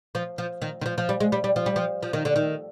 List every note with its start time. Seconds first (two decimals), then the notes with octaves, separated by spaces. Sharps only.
0.15 F3
0.38 F3
0.62 D#3
0.81 D#3
0.86 F3
0.98 F3
1.09 G3
1.20 G#3
1.32 G3
1.44 G3
1.56 F3
1.66 G3
1.76 F3
2.03 F3
2.13 D#3
2.25 D3
2.36 D#3